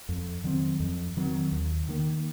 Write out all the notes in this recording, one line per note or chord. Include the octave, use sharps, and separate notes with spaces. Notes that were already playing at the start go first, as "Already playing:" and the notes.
F2
D#3 F#3 C4
F2
D#3 F#3 C4
D#2
D#3 A#3